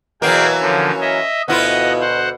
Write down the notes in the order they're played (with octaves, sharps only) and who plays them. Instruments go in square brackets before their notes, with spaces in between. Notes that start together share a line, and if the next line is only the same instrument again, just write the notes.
[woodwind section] B2 [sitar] E3 F#3 A#3 [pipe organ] G#4 F5 G5
[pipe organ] D3 F3 [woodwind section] C#4 A#4 C#5
[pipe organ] D#5 E5
[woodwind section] D2 B2 [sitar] B3 E4 F4 [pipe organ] D#5 F#5
[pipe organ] C5 F#5